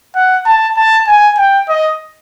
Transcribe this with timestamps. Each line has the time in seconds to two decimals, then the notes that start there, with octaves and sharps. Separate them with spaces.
0.16 F#5
0.46 A5
0.77 A5
1.07 G#5
1.38 G5
1.69 D#5